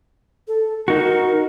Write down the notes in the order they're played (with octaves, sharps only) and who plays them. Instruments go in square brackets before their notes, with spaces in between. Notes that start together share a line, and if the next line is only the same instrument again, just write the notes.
[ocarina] A4
[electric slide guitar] D#4 F#4 [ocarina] A#4